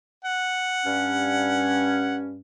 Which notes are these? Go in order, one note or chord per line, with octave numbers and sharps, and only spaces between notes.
F#5
G2 C#4